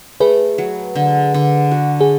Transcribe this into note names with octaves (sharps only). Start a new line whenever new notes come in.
A3 G#4 B4
F#3
D3
D3
F#4
G#4